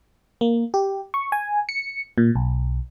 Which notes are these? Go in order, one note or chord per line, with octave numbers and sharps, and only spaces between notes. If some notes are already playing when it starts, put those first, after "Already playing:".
A#3
G4
C#6
G#5
C#7
A#2
B1